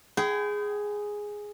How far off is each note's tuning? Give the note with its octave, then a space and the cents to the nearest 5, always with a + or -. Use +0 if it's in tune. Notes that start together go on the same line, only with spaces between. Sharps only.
G#4 +0 G5 -30 B5 +40